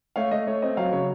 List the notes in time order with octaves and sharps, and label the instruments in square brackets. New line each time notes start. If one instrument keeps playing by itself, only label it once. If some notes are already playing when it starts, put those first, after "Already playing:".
[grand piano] A3 C#5 F5
A3 D#5
A3 C#5
C4 D#5
F#3 C#5 F5
C#3 C#5